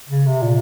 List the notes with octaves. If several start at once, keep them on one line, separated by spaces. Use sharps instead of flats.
C#3
C3
A#2